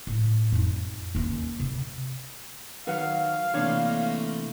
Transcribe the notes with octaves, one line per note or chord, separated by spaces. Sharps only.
A2
F2 D#4
D#2 C#4
C3
D#3 F#3 B4 F5 F#5
C3 E3 A3 A#3 D4 C#5